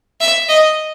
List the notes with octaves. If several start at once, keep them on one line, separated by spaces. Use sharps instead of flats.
E5
D#5